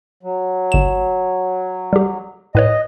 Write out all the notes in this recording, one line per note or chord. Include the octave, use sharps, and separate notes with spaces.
F#3
G1 E7
G3 G4
A2 B4 C#5 D#5